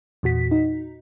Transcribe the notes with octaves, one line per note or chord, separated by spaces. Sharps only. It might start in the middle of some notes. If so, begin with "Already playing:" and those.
E2 A#2 F#4 B6
D#4